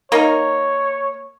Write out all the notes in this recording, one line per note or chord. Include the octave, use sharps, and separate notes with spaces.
A#3 D#4 A#4 C#5